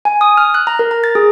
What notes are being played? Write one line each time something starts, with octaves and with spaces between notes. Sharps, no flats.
G#5
D#6
F6
F#6
A#5
A#4
A#5
A6
G#4